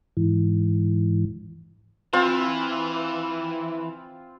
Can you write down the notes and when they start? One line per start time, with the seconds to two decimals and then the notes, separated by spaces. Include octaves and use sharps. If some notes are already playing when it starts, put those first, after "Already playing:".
0.17 G#2 E3
2.13 E3 C4 F4 C6